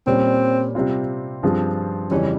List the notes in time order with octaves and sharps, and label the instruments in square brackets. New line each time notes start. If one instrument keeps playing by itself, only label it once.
[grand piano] A#2 G3 C#4 [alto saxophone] C4
[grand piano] C3 G3 C4 F4
G2 F3 C4 F4 G#4
[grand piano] F2 C#3 E3 G3 [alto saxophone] C#4